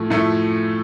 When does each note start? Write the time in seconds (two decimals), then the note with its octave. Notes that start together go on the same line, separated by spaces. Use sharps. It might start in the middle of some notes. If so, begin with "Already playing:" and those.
Already playing: A2 F3 A3
0.10 A2 F3 A3